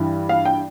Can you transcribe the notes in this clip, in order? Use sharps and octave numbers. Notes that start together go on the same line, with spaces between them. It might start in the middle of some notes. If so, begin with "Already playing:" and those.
Already playing: G2 E3 G3
F5
G5